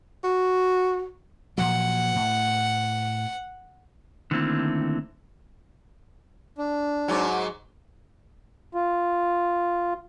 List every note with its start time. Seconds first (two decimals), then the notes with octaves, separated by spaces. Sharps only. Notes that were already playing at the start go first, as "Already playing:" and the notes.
0.24 F#4
1.58 A#2 F3 F#3 F#5
2.16 A2
4.31 D3 D#3 A3 A#3 C4 E4
6.58 D4
7.08 G#2 F#3
8.75 F4